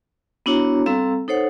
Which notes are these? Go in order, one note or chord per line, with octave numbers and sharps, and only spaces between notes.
B3 D4 E4 F#4 C#5 A#5
G3 C4 A4 F5 A#5 E6
D#4 A4 C5 C#5 F#5